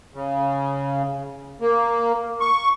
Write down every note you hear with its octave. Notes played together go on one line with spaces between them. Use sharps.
C#3
A#3
C#6